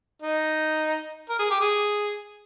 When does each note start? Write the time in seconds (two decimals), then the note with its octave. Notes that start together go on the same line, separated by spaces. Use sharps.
0.22 D#4
1.29 A#4
1.39 G#4
1.50 G4
1.61 G#4